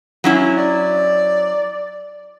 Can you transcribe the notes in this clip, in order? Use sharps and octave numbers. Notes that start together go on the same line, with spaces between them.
F#3 C#4 E4
D5